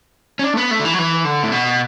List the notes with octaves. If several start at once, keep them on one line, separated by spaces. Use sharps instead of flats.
C#4
D4
A3
B3
A3
D3
E3
F#3
E3
D3
A2
B2